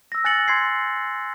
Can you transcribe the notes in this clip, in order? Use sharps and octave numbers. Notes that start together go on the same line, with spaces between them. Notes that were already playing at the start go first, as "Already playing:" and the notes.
E6 A#6
G#5 F#6 A6 A#6 C#7 F#7
C6 G#6 C7